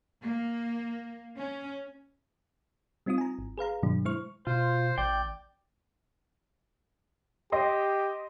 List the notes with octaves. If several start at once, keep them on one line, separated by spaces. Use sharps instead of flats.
A#3
C#4
G3 C4 D#4 F4 D#6
G#5 A#5
G#1
G#4 B4 F5 A#5
G2 B2 D#3 F#3 D4
G#3 E4 C5 C#6 F6
B2 F4 C5
A1 D5 G5
G4 D#5 G5 C6